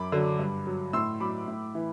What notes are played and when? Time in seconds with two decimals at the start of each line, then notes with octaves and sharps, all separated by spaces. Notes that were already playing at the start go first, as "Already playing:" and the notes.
Already playing: F#2 B5 D6
0.12 D3 F#3
0.39 G2
0.67 F#3
0.93 A2 C6 E6
1.20 F#3 B5 D6
1.48 A2
1.75 E3